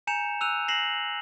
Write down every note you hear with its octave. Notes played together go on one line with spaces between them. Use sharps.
G#5 A#5 G6 C#7 E7 F7
E6 F#6 D#7 F7
A#6 C7 E7 F#7